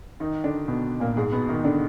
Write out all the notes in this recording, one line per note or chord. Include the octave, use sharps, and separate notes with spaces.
D#3 D#4
D3 D4
B2 B3
A#2 A#3
G#2 G#3
B2 B3
D#3 D#4
D3 D4